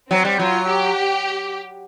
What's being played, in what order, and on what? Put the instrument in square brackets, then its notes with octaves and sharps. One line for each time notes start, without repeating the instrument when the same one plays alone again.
[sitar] F#3 [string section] C4
[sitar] G3
[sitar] F#3 [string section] F4
[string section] G4